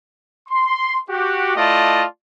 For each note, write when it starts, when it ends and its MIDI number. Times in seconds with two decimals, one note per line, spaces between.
0.48 0.99 84
1.09 1.53 66
1.09 1.53 67
1.56 2.04 57
1.56 2.04 64
1.56 2.04 65
1.56 2.04 74
1.56 2.04 75
1.56 2.04 81